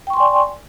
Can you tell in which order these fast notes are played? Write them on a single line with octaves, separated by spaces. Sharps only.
G5 C#6 C6 G#5 D5